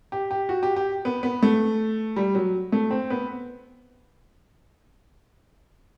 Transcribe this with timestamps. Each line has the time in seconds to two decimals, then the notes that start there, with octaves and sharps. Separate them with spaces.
0.12 G4
0.31 G4
0.49 F#4
0.63 G4
0.76 G4
1.05 B3
1.23 B3
1.43 A3
2.16 G3
2.35 F#3
2.72 A3
2.91 C4
3.10 B3